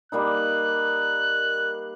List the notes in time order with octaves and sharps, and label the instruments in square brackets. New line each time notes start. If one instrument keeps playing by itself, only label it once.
[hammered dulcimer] G3 A#3 D#4 [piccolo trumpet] F#6